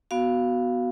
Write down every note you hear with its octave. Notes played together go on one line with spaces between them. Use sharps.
B3 F#4 F5